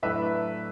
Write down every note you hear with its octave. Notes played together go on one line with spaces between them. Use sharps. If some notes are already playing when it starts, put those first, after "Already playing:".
A2 F#3 A3 D4 B4 E5